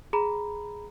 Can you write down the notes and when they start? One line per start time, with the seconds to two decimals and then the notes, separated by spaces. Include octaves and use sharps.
0.13 G#4 A#5 B5